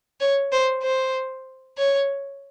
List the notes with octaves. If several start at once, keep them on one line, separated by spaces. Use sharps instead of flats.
C#5
C5
C5
C#5